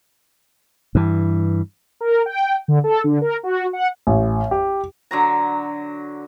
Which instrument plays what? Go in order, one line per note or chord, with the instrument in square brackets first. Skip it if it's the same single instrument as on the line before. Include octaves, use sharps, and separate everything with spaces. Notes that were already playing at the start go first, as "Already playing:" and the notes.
[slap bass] G2 E3
[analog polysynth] A#4
G5
D3
A4
D3
A#4
F#4
F#5
[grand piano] A1
G4
[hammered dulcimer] D3 F#3 A#5